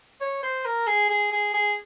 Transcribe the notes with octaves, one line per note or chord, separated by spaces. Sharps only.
C#5
C5
A#4
G#4
G#4
G#4
G#4